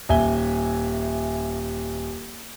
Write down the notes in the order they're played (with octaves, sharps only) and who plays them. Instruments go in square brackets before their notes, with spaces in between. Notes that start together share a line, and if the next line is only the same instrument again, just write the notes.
[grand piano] D#1 E5 G#5 G7